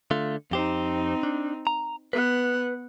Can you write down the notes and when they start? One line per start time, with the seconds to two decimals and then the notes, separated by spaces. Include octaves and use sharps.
0.11 D3 A3 F4
0.51 F2 C4 D#4 G4 C5
1.23 D4
1.67 A#5
2.13 B3 B4 F#5